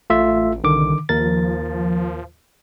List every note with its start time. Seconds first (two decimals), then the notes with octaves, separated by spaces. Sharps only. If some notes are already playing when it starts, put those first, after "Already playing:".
0.10 A1 A3 F4 E5
0.64 C2 D3 D#3 D6
1.09 D#2 F3 A#4 A6